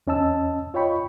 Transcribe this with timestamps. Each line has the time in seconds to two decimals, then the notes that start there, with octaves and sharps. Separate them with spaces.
0.07 E2 C#4 D#5 A5 E6
0.74 F4 C#5 D#5 G5 B5 C#6